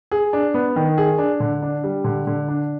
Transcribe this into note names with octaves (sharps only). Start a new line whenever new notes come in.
G#4
D4
B3
D#3
G#4
D4
D3
D4
G3
D3
D3
D4